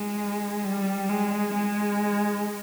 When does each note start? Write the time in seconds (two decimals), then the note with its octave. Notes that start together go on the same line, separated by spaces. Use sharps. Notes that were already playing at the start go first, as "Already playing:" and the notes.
Already playing: G#3
0.64 G3
1.09 G#3
1.54 G#3